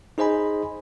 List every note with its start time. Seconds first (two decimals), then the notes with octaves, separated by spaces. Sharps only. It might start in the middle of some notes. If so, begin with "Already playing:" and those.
0.18 D#4 G#4 C5 D#5 G#5 B5